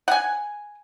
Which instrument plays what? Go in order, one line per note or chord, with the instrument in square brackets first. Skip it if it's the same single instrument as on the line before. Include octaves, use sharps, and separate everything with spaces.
[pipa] F#5 G#5